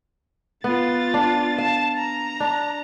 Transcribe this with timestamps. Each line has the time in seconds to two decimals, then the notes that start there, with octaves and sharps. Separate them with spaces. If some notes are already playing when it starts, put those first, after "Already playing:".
0.64 B3 F4 A6
1.14 D4
1.58 F5 A5
1.98 A#5
2.40 D4